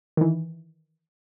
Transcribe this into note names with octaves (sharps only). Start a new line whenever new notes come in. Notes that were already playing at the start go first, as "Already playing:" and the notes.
D#3 E3